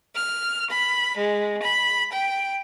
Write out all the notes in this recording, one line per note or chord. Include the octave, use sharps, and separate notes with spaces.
F6
B5
G#3
B5
G5